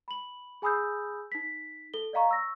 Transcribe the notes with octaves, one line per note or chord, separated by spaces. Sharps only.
B5 F#7
G#4 G#5 B5 D#6 E6 G6
D#4 B6
A4 G7
D5 D#5 F5 A#5 C#6
C#6 E6 A#6